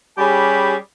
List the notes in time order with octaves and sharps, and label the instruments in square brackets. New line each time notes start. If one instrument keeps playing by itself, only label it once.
[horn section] G3 C#4 G4 G#4 G#5 B5